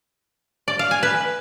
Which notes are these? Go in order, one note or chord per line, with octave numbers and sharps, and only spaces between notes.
D5
F5
G#5
B4